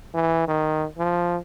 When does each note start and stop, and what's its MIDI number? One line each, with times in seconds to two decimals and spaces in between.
0.14 0.45 52
0.48 0.85 51
0.98 1.36 53